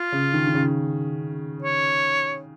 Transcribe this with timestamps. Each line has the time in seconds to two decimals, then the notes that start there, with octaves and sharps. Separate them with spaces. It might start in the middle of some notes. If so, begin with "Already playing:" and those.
Already playing: F4
0.12 C#3
0.33 D#3
0.47 D#3
0.54 C#3
1.63 C#5